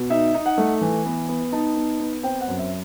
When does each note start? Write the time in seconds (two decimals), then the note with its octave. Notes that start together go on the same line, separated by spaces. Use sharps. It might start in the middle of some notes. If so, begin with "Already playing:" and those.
Already playing: B2
0.10 D#4 E5
0.34 D#4
0.46 F#5
0.58 A3
0.81 E3
1.05 B3
1.28 B3
1.52 D#4 A5
1.76 B3
2.00 B3
2.23 C4 G5
2.41 F#5
2.48 F#2
2.59 E5